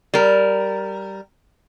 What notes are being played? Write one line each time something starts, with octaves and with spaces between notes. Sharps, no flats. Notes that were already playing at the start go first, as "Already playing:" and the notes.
G3 A#4